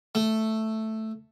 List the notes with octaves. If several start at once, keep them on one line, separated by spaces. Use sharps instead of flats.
A3